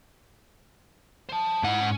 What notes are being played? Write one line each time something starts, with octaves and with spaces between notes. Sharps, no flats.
C5 A5
G#2 D#4 E4 F#5
C#4